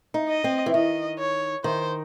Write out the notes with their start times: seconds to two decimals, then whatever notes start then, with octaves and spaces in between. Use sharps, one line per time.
0.14 D#4
0.29 D#5
0.44 C4
0.66 E3
0.74 D#3 D#5
1.19 C#5
1.64 D#3 C5